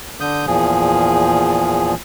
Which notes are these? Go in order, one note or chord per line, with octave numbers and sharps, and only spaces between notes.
D3 D#6 G6
E2 A#2 F3 G#4